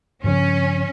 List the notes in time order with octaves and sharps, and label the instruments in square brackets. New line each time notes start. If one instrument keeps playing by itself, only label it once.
[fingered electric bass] G2 C#3 F3 [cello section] C#4